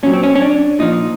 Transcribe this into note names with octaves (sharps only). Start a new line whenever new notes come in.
A#2 F#3 C#4
C4
C#4
C#4
D4
A#2 F3 D#4